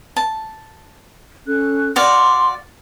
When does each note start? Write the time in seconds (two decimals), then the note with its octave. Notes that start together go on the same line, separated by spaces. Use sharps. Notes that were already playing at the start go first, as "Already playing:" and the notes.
0.16 A5
1.47 C#4 A4 F#6
1.96 F#4 D5 F5 C6